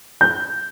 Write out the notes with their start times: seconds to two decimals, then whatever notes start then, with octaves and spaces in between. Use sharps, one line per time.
0.21 G6